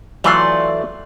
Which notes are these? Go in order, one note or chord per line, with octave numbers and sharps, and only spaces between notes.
E3 F#3 A3 F4 D5 C6